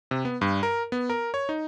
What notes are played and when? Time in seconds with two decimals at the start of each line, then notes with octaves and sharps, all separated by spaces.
0.11 C3
0.25 B3
0.41 G2
0.63 A#4
0.92 B3
1.10 A#4
1.34 C#5
1.49 D#4